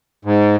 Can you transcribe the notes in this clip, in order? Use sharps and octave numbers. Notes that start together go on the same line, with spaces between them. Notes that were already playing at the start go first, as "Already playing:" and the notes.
G#2